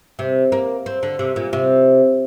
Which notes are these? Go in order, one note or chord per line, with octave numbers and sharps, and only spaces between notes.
C3
A#3
C4
D3
C3
A#2
C3